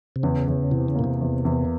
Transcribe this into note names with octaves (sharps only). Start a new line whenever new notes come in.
C3
E2 C#3
E2
C3 E3
C#3
A#2 A#3
C3
E2
E2